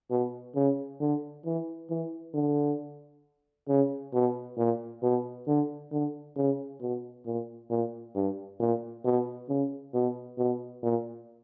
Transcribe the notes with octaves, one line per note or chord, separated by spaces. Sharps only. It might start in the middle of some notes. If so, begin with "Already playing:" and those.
B2
C#3
D3
E3
E3
D3
C#3
B2
A#2
B2
D3
D3
C#3
B2
A#2
A#2
G2
A#2
B2
C#3
B2
B2
A#2